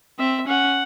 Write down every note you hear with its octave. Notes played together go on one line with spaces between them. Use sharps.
C4 E5
C#4 F#5